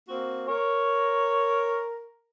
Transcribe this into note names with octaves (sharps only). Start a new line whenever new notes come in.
A#3 C4 F#4
A#4 C#5